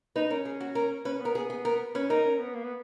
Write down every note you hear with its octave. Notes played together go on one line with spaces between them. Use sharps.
D#4 B4
C#4 A#4
G#4
F#4
A#4
C#4 B4
B3 A#4
G#4
G#4
A#4
C#4 B4
D#4 A#4
C#4
B3
A#3
B3